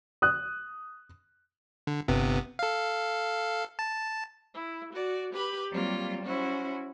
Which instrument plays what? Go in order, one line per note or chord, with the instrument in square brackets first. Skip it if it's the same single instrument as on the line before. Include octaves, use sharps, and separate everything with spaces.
[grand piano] D#6 F#6
[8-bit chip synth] D3
G1 C3 B3
A4 F5
A5
[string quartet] E4
F#4 D5
G4 B4 B5
F#3 G3 A#3 C4 F4
C#4 E4 F#4 C5